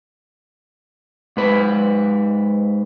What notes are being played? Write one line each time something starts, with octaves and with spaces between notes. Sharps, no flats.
G#2 B4